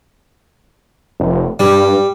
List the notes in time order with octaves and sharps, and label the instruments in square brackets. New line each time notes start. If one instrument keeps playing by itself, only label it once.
[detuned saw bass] F1
[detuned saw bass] G2 [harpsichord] G3